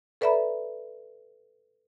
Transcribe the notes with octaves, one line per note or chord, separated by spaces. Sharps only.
A4 B4 D5 E5 A#5 B5